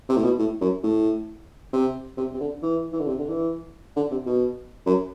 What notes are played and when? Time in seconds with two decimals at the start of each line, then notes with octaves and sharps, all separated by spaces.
0.09 C3
0.17 A2
0.24 B2
0.39 A2
0.61 F#2
0.83 A2
1.73 C3
2.17 C3
2.34 C3
2.40 D3
2.62 E3
2.92 E3
3.00 D3
3.07 C3
3.19 D3
3.29 E3
3.96 D3
4.11 C3
4.26 B2
4.86 F#2